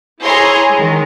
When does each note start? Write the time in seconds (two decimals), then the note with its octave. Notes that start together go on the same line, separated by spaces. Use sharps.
0.23 E4 G#4 C#5 A#5 C6
0.73 D#3 G#3